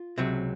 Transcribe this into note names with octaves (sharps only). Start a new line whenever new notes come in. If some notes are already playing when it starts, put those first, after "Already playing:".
Already playing: F4
C#2 C3 F#3 C4